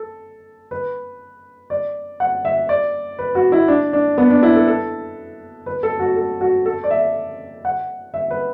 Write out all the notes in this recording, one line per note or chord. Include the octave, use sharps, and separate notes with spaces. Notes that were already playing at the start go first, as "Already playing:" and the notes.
Already playing: A4
B4
D5
F#5
E5
D5
B4
F#4
E4
D4
D4
B3
D4
E4
A4
A4
B4
A4
F#4
A4
F#4
A4
D5
E5
F#5
E5
B4